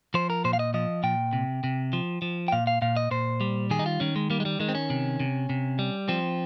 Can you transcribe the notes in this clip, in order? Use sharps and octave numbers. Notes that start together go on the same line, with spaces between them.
F3 C5
A#4
A#2 C5
F5
D#5
F3 D#5
A#2 G5
C3
C3
F3
F3
G5
A#2 F5
F5
A#2 F5
D#5
A#2 C5
G3
D#3 G#4
D#4
F4
D#3 C#4
G#3
G3 A#3
G#3
G3
D#3 G#3
C4
C#4
C3
C3
C3
G3
F3 C4